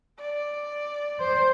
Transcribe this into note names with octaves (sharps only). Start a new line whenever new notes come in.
D5
C5